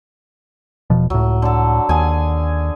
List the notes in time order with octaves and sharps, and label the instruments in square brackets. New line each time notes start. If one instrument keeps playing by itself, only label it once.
[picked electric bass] E1 B2 F3
[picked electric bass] C#2 A2 [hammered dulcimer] F#3
[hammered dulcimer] D3 A4
[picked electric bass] D#2 [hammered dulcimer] G#4 G#5